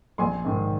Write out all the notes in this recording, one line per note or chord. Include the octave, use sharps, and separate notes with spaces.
A#1 G#5 C6
G#2 D#3